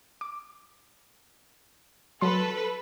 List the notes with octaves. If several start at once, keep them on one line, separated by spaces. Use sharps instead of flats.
D6
F#3 A4 B4 C6